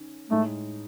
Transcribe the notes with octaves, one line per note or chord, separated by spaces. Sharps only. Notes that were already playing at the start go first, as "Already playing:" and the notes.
Already playing: D#3 C#4
A2 G#3 A3 D#4